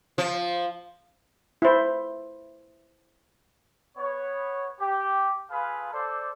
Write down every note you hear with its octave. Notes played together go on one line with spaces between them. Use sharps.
F3
E4 C5
B3 C#5
G4
F4 G#4 A4 B4 F5 B5
A4 C5 D5